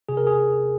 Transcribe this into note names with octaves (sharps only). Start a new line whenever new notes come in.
C3 G#4
A#4
G#4